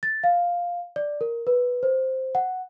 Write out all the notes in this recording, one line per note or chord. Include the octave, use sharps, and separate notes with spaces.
A6
F5
D5
A#4
B4
C5
F#5